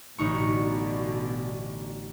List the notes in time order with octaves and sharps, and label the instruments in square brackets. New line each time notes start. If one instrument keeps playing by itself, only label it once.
[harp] A1 D#4 C#6 [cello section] B2 D3